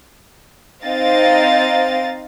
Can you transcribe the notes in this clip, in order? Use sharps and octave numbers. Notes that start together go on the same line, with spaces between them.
C4 D#4 D#5 F5 A6